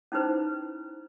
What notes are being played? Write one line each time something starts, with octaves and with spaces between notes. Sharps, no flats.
C#4 D#4 E4 B4 C5